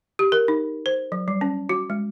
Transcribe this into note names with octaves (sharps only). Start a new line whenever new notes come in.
G4
A#4
D#4
C5
F#3
G3
C#4
F#4
G#3